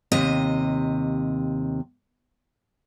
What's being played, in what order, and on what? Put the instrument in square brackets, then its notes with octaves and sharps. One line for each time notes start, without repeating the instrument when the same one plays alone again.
[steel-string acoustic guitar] D#2 C3 D#5